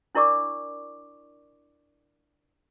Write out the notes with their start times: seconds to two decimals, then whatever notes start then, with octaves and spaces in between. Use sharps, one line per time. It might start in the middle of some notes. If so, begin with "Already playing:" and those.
0.15 D4 E4 A#4 D5 C#6 D6